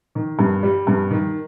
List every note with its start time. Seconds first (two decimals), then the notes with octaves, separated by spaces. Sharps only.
0.15 D#3
0.39 G2
0.63 G3
0.87 G2
1.11 D#3